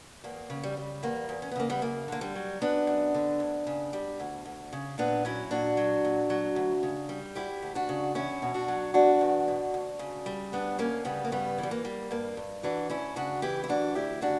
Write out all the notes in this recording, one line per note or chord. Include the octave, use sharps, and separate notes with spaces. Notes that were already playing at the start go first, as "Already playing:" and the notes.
E2 A#3
C#3
G3
G3
E2 A#3
E2
C#4
B3
C#3 A#3
G3 B3
F#2 A#3
D3 A#3
G3
F#3
F#2 B3 D4
F#2
D3
D2
C#3
G3
D2
D2
C#3
A#2 B3 D4
F#3 C#4 E4
A#2 D4 F#4
F#3
A#2
F#3
D2
C#3
G3
D2 E4 G4
D2
D4 F#4
C#3
E2 C#4 E4
B2
D4 F#4
F#3
E2 D4 F#4
E2
B2
D2
C#3
G3
D2 B3 D4
D2 A#3 C#4
C#3 G3 B3
A#3
G2 G3 B3
E3 G3
A#3
G3
G2 A#3
G2
E3 D4 F#4
D2 C#4 E4
C#3 D4 F#4
E3 E4 G4
E4
D2 D4 F#4
D2 E4 G4
C#3 D4 F#4